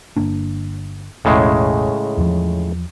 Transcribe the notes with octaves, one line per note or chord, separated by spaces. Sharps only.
G1 A#3 D4
E1 A1 A2 C#3 G#3
E2 F3